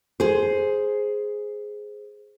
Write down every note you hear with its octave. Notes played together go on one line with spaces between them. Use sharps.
G#4 C5